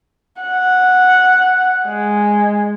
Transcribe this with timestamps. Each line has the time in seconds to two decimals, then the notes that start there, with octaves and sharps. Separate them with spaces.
0.42 F#5
1.86 G#3